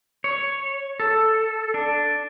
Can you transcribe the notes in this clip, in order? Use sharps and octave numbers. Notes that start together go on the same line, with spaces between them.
C#5
A4
D4